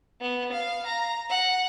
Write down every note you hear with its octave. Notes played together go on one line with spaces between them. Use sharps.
B3
F5
A#5
F#5